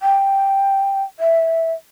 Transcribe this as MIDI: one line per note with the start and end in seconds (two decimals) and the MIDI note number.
0.02 1.03 79
1.19 1.72 76